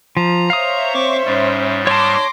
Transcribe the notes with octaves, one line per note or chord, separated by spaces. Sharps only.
F3 A#5
C5 C#5 E5 F5 D#6
C4 C#6 D6
G#2 G3 C#4
C#5 A5 C6 D6 A#6